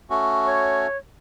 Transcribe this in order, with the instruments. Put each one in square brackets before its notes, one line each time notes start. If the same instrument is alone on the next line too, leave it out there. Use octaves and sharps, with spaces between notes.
[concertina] A3 C#4 F#4
[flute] C#5